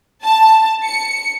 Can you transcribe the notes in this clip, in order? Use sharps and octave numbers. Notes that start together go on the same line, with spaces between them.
A5
C#7